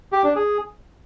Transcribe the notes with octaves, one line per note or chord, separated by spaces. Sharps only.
G4
D4
G#4